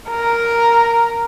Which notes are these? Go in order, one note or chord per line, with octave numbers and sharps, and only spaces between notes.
A#4